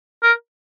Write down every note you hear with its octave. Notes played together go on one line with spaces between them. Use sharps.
A#4